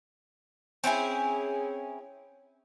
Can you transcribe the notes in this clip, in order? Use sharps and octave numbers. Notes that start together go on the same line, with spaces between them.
C4 C#4 E4 G#4